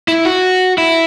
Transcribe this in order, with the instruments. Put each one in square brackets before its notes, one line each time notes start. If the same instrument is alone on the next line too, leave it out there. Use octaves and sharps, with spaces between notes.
[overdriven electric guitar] E4
F#4
E4